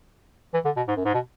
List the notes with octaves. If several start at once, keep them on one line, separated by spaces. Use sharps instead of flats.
E3
D3
B2
G#2
F#2
G#2
B2